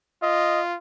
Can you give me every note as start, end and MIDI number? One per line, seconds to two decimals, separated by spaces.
0.23 0.77 65
0.23 0.61 75